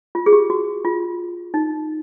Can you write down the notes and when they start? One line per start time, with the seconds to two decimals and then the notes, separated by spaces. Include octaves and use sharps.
0.15 F4
0.26 G#4
0.32 G4
0.50 F#4
0.85 F4
1.54 D#4